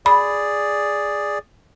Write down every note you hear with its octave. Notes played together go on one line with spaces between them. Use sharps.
G#4 D5 B5